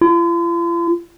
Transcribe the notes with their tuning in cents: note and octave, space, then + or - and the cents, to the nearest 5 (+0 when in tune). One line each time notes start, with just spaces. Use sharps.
F4 -45